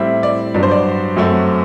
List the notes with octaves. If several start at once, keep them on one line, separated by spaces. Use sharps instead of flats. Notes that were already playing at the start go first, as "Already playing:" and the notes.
Already playing: A2 G3 C4 E4 E5
D5
G2 F#3 B3 D5
C5
D5
F#2 F#3 A3 C4